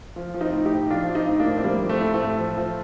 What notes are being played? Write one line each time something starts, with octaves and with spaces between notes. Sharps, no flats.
F3
F3
C4 D#4
A2
D#4 G4
A2
F3 D4 F4
F3 F4
C4 D#4
A2
A#3 D4
A2
C4
F3 G3 A#3
F3
A3 C4
A2
A3 C4
A2
F3
F3